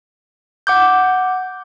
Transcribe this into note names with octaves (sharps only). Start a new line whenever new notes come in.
F#5 D6 G6